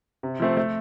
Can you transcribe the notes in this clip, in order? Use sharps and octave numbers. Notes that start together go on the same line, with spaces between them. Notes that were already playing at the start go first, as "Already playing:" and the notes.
C3
F3 A3 C4
A3